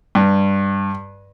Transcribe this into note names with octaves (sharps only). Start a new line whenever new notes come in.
G2